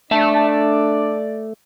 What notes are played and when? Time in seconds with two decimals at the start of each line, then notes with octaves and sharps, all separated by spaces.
0.11 A3 D4 D5 E5 A5